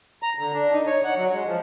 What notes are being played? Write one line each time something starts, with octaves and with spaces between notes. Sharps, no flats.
A#5
D3
D4
D#4
C#5
F#5
F#3
G#3
F3